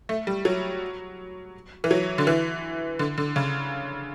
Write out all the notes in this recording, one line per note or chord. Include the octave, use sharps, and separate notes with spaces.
A3
G3
F#3
E3
F#3
D3
E3
D3
D3
C#3